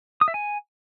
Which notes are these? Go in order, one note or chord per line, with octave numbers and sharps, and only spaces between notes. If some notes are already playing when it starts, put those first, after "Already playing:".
D#6
E5
G#5